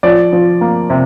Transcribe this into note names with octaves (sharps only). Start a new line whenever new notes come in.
F3 D5
F3
A#3
C3